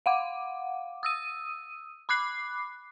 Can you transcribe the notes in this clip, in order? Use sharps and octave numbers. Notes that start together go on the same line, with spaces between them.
F5 F#5 D6
D#6 E6 D#7
B5 D6 F#6 C7